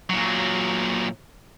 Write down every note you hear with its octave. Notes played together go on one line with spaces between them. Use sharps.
A#2 F#3